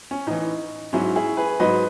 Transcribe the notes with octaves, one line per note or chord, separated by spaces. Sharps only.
C#4
A2 E3 D#4
G#2 F#3 C#4 E4
E4 G#4
G#4 B4
G#2 F#3 B4 D#5